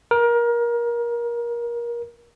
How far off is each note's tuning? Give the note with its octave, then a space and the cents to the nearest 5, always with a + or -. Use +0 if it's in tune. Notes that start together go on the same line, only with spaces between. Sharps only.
A#4 +25